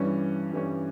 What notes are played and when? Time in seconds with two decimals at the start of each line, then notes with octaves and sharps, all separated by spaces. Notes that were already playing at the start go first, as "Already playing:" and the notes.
Already playing: G2 E3 G3 C#4
0.52 G2 E3 G3 C#4